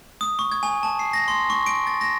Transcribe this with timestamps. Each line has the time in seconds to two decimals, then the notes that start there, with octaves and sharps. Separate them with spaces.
0.21 D#6
0.39 C#6
0.52 G#6
0.63 G#5
0.83 A5
0.99 C7
1.13 A#6
1.28 C6
1.50 C#6
1.66 D7
1.87 A6
2.01 A#6